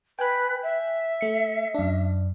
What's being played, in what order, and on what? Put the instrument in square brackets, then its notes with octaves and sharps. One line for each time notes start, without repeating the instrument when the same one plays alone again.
[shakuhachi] B4 [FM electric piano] G5 G#5 F#6
[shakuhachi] E5
[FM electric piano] A3 C#7
F#2 D4